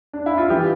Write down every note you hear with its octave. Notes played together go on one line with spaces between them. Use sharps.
D4
E4
F4
E3 G4